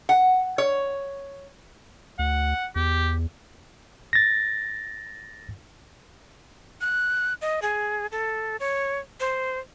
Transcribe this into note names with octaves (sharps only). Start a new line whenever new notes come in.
F#5
C#5
D2 F#5
E2 G4
A6 A#6
F#6
D#5
G#4
A4
C#5
C5